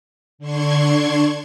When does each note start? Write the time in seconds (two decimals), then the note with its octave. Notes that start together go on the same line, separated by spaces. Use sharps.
0.38 D3 D4 C6 C#6 G#6